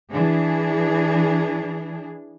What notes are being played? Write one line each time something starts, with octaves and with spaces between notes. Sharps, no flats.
E3 D4 G#4